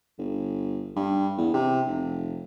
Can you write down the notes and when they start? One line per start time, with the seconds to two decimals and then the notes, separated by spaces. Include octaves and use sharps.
0.18 G1
0.96 G2
1.38 E2
1.54 C3
1.87 F1